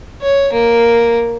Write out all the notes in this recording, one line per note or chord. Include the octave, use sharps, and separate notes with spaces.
C#5
A#3